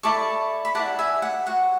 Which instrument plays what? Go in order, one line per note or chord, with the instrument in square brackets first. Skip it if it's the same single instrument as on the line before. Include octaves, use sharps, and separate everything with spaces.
[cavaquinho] E4 A4 D5 A5 C#6
B5
E4 B4 D5 F#5 A5
E5 G#5
F#5
F#4 C#5 F#5